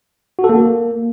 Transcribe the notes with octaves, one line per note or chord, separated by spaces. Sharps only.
F#4
A4
A#3